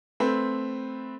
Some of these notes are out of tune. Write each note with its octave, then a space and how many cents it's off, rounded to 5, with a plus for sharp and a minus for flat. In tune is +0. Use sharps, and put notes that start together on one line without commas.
A3 +0 C4 +0 B4 +0